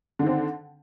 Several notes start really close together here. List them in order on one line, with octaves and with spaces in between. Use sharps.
D3 D#3 C4